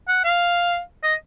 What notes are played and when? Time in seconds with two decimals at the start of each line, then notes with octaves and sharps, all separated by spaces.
0.08 F#5
0.24 F5
1.03 D#5